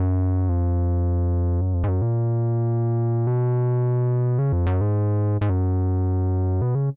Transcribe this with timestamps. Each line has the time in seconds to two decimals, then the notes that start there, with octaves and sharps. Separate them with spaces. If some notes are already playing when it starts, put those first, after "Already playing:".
Already playing: F#2
0.49 F2
1.61 F#2
1.74 F2
1.84 G#2
1.88 F#2
2.02 A#2
3.27 B2
4.39 C#3
4.53 F2
4.66 F#2
4.81 G#2
5.41 G#2
5.50 F#2
6.62 B2
6.75 C#3